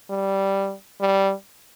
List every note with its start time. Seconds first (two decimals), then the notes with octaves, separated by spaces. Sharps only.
0.10 G3
1.01 G3